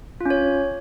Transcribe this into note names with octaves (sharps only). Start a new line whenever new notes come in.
C#4 F4 C#5